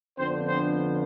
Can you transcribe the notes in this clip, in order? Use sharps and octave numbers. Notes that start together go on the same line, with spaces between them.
F2 D3 F3 B3 C4 D4 C5
C4 C5